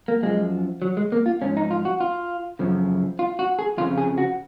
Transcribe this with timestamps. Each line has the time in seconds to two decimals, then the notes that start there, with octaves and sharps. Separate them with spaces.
0.08 A#3
0.22 F#2 F3 G#3
0.82 F#3
0.97 G#3
1.12 A#3
1.26 F4
1.41 G#2 F3 C#4
1.57 D#4
1.71 F4
1.85 F#4
2.00 F4
2.59 F#2 C#3 F3
3.19 F4
3.39 F#4
3.59 G#4
3.77 F2 C#3 F3 F4
3.98 G#4
4.18 F#4